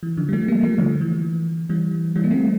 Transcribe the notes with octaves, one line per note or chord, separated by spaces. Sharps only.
E3
D3 F3
G3
F3 A3
G3 A#3
F3 A3
D3 F3
E3
E3 G3
E3 G3
A#3
A3 C4